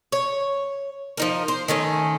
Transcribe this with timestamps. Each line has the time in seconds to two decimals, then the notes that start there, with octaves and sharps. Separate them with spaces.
0.12 C#5
1.17 F3 D#4 A#4
1.48 C5
1.68 D#3 A3 C#4